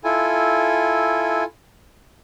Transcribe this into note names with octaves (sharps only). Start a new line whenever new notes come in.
E4 F4 A4 G#5